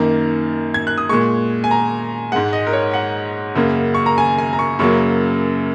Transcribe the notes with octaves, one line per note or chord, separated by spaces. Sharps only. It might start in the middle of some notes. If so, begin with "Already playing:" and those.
Already playing: F#2 D#3 A#3 A#5
G#6
F#6
D#6
A#2 G#3 C#6
G#5
A#5
G#2 G#3 F#5
D#5
A#4
C#5
F#5
F#2 C#3 A#3
C#6
A#5
G#5
G#5
A#5
C#6
F#2 C#3 F#3 A#3 C#6